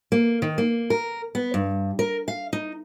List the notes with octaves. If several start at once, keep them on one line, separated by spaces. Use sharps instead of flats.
A#3
D#3
A#3
A#4
B3
G2
A#4
F5
D#4